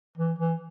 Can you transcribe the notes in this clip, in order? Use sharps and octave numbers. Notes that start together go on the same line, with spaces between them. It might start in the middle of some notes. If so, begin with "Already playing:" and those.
E3
E3